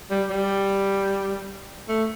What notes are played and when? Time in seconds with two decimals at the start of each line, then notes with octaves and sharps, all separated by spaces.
0.10 G3
0.30 G3
1.88 A3